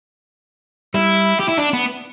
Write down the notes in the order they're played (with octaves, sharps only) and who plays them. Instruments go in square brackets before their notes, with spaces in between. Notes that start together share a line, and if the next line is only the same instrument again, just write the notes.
[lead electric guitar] G3 [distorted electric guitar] E4
[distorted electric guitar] G4
E4
D4
B3